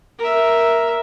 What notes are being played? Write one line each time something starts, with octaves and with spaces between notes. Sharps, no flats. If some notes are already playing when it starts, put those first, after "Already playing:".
A#4 E5